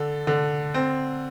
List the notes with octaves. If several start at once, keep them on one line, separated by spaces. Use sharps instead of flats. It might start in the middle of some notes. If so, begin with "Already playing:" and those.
Already playing: D3 A4
D3
C4